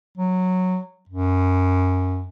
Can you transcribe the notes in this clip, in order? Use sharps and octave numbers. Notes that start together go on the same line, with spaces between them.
F#3
F#2